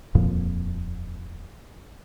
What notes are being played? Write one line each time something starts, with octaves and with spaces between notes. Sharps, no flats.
D#1 F2 A#2 F3